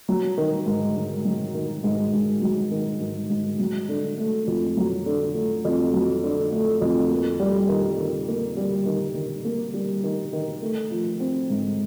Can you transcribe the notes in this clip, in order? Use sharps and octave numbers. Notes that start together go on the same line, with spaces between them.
F#3
D#3
G#2
G#2
F#3
D#3
G#2
G#2
F#3
D#3
G#2
G#2
F#3
D3
A3
F2
F#3
D3
A3
F2
F#3
D3
A3
F2
A#3
G3
D#3
D#3
A#3
G3
D#3
D#3
A#3
G3
D#3
D#3
A3
F3
C4
G#2